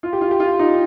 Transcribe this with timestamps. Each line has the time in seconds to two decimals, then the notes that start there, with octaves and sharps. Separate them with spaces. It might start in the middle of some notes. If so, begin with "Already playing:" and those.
0.03 F4
0.13 G4
0.21 F4
0.31 G4
0.40 F4
0.59 D#4